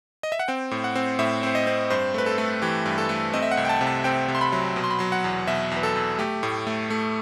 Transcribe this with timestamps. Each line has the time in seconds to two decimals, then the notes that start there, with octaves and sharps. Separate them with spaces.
0.23 D#5
0.32 E5
0.39 F#5
0.48 C4 G5
0.71 A2
0.84 F#5
0.96 C4
1.19 A2 E5
1.43 C4 C5
1.55 D#5
1.67 C4
1.90 G2 C5
2.14 A3 B4
2.26 A4
2.38 A3
2.62 E3 G4
2.86 G2
2.98 A4
3.09 A3
3.34 C4 D#5
3.42 E5
3.51 F#5
3.57 C2
3.65 G5
3.69 A5
3.81 C3
3.87 A5
4.04 C4 G5
4.28 C3
4.35 C6
4.41 B5
4.52 F#3
4.76 B2
4.84 C6
4.90 B5
4.99 F#3 C6
5.12 F#5
5.24 E2
5.47 B2 E5
5.71 E2
5.76 B4
5.83 A4
5.96 E2
6.19 A3 G4
6.43 A2
6.67 A3
6.90 A3